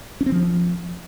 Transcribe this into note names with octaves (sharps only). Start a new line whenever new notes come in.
C#4
C4
F3